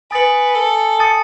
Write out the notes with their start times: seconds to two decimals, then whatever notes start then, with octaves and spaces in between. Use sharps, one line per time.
0.11 B4 G#5 D#6 A6 C#7 F#7
0.55 A4
1.00 A5 D#6 A6 C#7